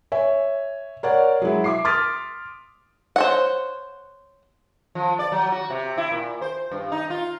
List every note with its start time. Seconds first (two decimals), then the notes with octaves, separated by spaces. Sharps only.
0.12 C#5 E5 G#5
1.03 A#4 C#5 D5 F#5
1.42 F#3 G#3 E4
1.64 E5 D6 C7
1.85 C6 D6 D#6 F6 A6 B6
3.16 C5 C#5 F#5
4.95 F3
5.19 D5
5.32 F#3
5.52 F#4
5.70 C3
5.98 E4
6.12 A#2
6.41 C5
6.71 G2
6.92 D#4
7.10 F4